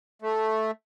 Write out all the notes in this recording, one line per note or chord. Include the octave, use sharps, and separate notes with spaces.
A3